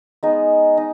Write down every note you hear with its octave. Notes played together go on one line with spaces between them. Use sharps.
G#3 B3 D#4
D#4